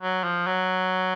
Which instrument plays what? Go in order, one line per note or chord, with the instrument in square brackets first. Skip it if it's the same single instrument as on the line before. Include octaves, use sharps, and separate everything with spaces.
[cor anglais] F#3
F3
F#3